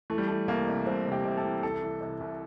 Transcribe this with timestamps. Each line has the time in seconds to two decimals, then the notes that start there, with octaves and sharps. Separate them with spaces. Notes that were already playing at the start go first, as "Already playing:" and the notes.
0.10 E3 A3
0.18 G3
0.27 E3 A3
0.48 C2 A#3
0.67 C3
0.87 C2 C4
1.06 C3
1.12 G4
1.25 C3
1.38 A4
1.44 E3
1.63 C2 A4
1.82 E3
2.01 C3
2.21 C2